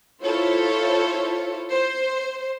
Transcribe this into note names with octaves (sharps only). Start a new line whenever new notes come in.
E4 F4 A4 C5 C#5
C5